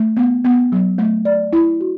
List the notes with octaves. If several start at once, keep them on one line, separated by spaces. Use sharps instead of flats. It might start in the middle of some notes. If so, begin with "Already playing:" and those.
Already playing: A3
B3
B3
F#3
A3
D5
E4
F#4